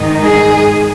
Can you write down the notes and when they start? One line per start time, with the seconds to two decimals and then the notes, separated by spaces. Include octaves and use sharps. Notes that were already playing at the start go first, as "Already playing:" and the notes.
Already playing: G#2 D#3 G#3 D#4
0.23 G#4